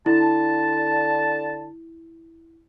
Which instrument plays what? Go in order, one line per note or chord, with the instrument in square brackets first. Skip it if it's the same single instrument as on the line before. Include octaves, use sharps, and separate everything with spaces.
[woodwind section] D3 A5 [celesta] E4